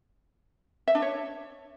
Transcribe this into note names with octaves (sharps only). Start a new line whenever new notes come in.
E5
D4
C#5